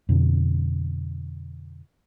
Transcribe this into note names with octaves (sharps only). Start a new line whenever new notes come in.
F2 B2 D3